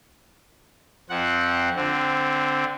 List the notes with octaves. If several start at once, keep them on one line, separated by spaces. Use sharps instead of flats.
F2 C4 F#5
D3 C4